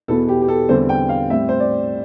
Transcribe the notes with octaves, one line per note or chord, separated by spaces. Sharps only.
E2 B2 B3 E4 A4
G4
G4
A4
E2 D3 G3 C4 C5
G5
F5
A2 G3 C4 E5
C5
D5